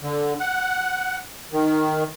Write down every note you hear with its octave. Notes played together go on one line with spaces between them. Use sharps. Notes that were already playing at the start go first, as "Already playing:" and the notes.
D3
F#5
D#3